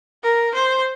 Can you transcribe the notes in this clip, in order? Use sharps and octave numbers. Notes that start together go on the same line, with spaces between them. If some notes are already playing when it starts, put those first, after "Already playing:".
A#4
C5